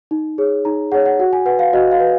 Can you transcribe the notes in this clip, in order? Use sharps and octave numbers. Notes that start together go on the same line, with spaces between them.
D#4
G#4 C#5
D#4 A#5
G#4 C#5 F#5
F#5
F#4 F#5
G#5
B4 F#5
F5
F#4 D#5
F5
B4